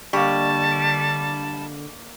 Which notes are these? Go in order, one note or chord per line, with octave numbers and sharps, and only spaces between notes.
D3 G3 A#3 D#5 A5 C#6